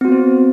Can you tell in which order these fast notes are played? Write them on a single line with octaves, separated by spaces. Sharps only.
C4 F#4 B3 C5